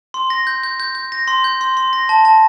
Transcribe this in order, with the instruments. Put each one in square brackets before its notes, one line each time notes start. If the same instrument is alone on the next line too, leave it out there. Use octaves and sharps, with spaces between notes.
[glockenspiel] C6
A#6
G6
G6
G6
G6
A#6
C6
G6
C6
C6
A#6
A5
A5